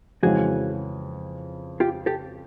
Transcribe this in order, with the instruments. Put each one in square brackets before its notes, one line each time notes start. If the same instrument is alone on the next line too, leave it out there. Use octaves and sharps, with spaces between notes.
[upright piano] F2 C#3 E3 G#3 C#4 [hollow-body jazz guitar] F#4 G#4
[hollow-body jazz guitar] F4 G4
G4 A4